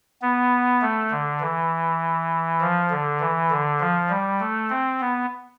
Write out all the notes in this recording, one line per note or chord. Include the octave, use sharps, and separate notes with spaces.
B3
A3
D3
E3
F3
D3
E3
D3
F3
G3
A3
C4
B3